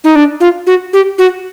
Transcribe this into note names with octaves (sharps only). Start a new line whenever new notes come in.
D#4
D4
F4
F#4
G4
F#4